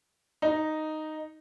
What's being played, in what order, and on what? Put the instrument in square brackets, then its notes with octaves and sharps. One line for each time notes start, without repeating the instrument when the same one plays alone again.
[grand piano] D#4